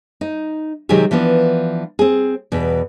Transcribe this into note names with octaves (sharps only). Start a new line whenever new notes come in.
D#4
C3 D#3 F#3 G#3 G4 G#4
E3 F3 B3 D4
C4 G#4
E2 B2